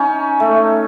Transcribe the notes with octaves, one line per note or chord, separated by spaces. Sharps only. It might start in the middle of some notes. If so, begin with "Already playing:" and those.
Already playing: C#4 D#4
A3